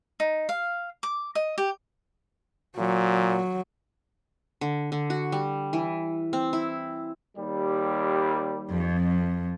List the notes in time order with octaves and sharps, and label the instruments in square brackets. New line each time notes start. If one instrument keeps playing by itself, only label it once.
[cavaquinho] D#4
F5
D6
D#5
G4
[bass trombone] A#2 [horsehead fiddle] F#3
[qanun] D3
D3
F#4
G3
E3
C4
E4
[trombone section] D#2 G3
[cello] F2